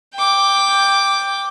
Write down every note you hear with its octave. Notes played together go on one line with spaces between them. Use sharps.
G5 D6